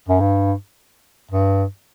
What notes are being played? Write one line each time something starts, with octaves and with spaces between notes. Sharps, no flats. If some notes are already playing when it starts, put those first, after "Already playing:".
F#2
G2
G2